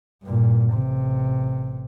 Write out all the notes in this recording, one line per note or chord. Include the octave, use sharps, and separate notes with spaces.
G2 A#2
A1 C3